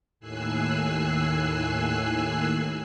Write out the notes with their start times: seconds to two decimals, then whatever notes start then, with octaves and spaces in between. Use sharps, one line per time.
0.20 D#2 A2 G#5 E6 F#6 C7